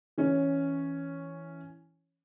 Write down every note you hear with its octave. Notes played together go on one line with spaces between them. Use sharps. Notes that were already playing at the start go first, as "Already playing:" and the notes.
E3 C#4 C#5